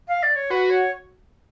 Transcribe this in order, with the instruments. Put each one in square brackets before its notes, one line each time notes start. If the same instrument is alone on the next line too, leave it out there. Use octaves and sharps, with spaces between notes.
[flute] F5
D5
C#5
[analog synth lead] F#4 [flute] B4
[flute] C#5